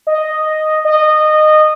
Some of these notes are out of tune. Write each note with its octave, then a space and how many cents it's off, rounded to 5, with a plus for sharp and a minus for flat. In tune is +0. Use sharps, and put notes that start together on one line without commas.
D#5 -5
D#5 -20